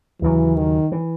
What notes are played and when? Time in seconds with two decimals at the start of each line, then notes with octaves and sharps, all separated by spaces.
0.21 D#2 C#3 E3 F#3
0.56 D#3
0.92 E3